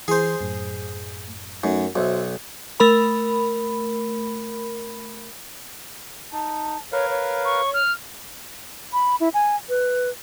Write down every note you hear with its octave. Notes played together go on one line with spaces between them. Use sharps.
E3 G#4 C5 C6
F#2 A2
F#2 A3 D#4
B1 F#4 C5 E5
A3 A#4 B5
D#4 A5
A#4 B4 C#5 F5
C#5
C#6
F6
B5
E4
G#5
B4